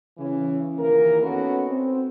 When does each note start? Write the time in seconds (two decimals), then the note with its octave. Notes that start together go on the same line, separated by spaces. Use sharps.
0.18 C#3 E3 C#4
0.78 D#2 D#3 E3 A#3 A#4
1.22 B3 C#4 D#4 F#4 A4 B4
1.68 C4